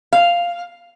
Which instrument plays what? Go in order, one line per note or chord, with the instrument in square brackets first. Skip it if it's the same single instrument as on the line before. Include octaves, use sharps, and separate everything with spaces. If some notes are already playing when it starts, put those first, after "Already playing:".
[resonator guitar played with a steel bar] F5